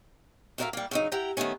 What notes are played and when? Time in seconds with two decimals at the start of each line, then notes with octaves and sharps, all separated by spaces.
0.58 A2 F#4 A#4 D5 E5 F5
0.73 G3 A#3
0.91 C#3 F#3 D#4
1.12 E4 G4 F#5 G5 A#5
1.37 D#3 E3 A3 B3 C#4